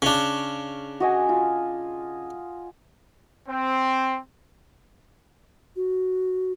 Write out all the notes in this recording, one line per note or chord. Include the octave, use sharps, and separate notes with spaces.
C#3 D4
F#4 D#5 G#5
F4
C4
F#4